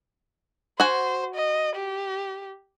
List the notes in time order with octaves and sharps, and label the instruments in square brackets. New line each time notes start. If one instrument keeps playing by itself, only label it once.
[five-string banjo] F#4 G#5 [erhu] C5
[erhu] D#5
G4